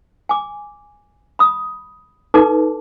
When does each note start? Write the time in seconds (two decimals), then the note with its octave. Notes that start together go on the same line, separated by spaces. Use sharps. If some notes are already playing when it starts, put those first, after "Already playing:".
0.29 G#5 D6
1.39 B5 D#6
2.34 D#4 A4 B4 A5 D6